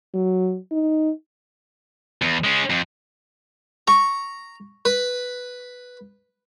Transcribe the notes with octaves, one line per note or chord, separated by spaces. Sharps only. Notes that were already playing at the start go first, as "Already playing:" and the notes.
F#3
D#4
E2
G#3 C#4
F2
A#5 C#6
B4